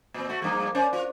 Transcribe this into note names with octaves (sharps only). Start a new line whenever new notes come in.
A#2 C4
A3 F#4
G2 F3 A#3
C#4 C5 D5
F4